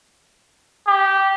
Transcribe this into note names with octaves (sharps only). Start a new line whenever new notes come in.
G4